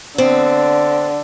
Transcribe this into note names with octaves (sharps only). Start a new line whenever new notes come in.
D3 B3 C4